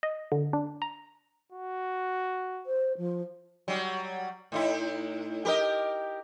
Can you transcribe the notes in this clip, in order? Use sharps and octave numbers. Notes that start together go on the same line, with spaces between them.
D#5
D3
D4
A#5
F#4
C5
F3
F#3 G3
A2 D#4 E4
G4 A#4 D#5